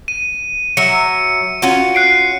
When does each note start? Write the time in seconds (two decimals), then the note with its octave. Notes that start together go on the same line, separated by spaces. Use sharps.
0.08 D#7
0.77 F#3 E5 C#7
1.62 C#4 F4 F#4
1.95 F#6 C7 D7